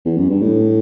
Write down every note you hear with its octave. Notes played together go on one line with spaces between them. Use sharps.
E2
F#2
G2
A2